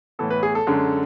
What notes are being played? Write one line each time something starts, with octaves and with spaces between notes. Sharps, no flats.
A2 E3 B3 A4
B4
G#4
A4
F#2 D3 G#3